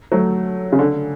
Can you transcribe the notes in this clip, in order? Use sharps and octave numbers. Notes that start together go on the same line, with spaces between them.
F#3 A3
C#3
D3